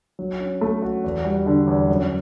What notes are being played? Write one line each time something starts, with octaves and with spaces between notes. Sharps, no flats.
F#3
C#4
A3
F#4
E2
G3
D3
E2
F#2